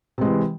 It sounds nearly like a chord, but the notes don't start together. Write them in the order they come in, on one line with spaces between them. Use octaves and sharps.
C3 G#3 E3